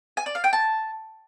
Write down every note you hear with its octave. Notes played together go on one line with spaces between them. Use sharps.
G#5
D5
F5
G5
A5